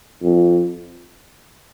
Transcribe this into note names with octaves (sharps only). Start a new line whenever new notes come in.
F2